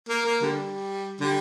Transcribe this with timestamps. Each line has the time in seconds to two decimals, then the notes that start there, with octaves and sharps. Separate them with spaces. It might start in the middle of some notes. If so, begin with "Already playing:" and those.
0.09 A#3
0.25 A#3
0.42 D3 G3
1.20 D3 G3